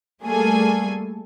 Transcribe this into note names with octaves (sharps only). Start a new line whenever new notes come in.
G3 A3 A#3 G#4 A4 G#5